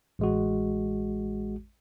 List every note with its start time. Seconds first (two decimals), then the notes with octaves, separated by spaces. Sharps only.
0.19 A1 G#3 F#4